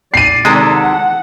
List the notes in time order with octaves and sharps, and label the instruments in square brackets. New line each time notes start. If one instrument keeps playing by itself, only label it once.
[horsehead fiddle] D5 [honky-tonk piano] C7 D#7
[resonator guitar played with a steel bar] C3 D#3 A4 [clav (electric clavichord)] G#3
[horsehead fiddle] F#5